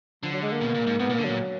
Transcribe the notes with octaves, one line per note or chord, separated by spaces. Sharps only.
D3 F3
F#3
G#3
A#3
B2
A#2
G#2
G#2 B3
A#2 A#3
D3
A#2 F#3